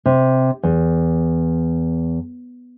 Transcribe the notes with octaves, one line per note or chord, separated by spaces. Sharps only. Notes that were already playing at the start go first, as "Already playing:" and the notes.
C3
E2